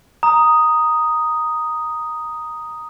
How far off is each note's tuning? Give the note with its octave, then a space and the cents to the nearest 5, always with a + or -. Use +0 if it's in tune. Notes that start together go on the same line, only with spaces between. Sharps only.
A#5 +0 D#6 +0